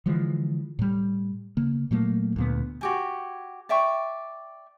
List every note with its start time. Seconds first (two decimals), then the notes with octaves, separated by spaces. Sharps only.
0.06 D3 E3 F3 G#3
0.79 A2 G3
1.57 C#3 A#3
1.91 A#2 F#3 A3 A#3
2.36 D2 A#2 B3
2.81 F#4 G4 G#5
3.69 D5 E5 G5 C#6